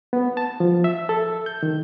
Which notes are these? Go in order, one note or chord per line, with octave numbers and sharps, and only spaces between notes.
B3
A5
F3
E5
A4
G6
D#3